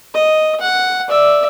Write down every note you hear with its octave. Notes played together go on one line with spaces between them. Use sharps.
D#5
F#5
D5 E5